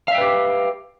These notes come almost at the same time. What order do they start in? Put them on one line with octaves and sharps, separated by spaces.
F5 E5 G5 B4 G4